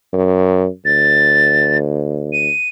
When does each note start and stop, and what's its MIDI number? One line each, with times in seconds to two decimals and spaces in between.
0.13 0.66 42
0.85 2.49 38
0.85 1.77 93
2.33 2.69 99